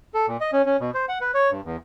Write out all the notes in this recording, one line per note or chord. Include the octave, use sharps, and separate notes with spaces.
A4
A#2
D#5
C#4
C#4
B2
C5
F#5
B4
C#5
G2
E2